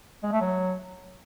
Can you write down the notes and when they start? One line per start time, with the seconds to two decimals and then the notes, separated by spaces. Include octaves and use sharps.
0.23 G#3
0.32 A3
0.41 F#3